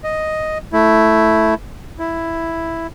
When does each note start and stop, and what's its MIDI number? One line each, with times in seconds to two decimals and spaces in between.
0.04 0.58 75
0.73 1.54 57
0.73 1.54 64
1.99 2.87 64